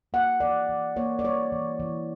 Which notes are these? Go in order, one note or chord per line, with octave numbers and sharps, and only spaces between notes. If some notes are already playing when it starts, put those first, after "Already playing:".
A#3 F#5
E3 D5
E3
A#3 C#5
D5
G3 C#5
E3
E3